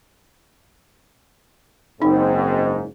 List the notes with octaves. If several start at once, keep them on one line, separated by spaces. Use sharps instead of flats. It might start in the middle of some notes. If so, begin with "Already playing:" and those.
F#1 G#2 C4 D#4